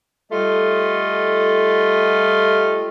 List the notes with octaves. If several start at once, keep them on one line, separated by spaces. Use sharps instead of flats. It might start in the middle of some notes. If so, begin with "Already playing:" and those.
G3 A3 F4 A4 D#5